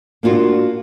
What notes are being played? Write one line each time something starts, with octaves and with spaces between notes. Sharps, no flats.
A#3 D4 F4 F#4